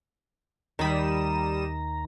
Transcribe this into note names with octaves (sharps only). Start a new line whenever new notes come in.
D#2 D#3 G3 A#5 B5 D#6 E7